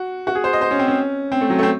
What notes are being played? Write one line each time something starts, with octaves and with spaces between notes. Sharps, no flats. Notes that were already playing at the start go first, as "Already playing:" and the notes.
Already playing: F#4
F#4
G#4
C5
D#5
C5
C#4
C4
C#4
C4
A3
F#3
A3
C4